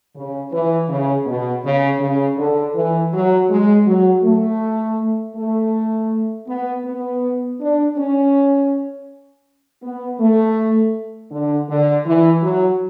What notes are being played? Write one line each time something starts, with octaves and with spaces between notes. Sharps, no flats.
C#3
E3
C#3
B2
C#3
C#3
D3
E3
F#3
G#3
F#3
A3
A3
B3
B3
D4
C#4
B3
A3
D3
D3
E3
F#3